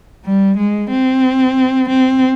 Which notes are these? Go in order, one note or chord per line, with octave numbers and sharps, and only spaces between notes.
G3
G#3
C4
C4